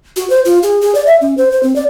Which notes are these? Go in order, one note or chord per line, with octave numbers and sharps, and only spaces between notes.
F#4
C5
F4
G#4
G#4
D5
E5
C#4
C5
C5
C4
D5